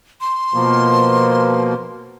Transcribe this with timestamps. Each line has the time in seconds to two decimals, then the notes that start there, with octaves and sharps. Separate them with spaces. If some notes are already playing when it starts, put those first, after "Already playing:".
0.21 C6
0.54 B2 F3 A#3